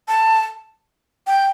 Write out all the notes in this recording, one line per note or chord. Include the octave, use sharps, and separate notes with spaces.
A5
G5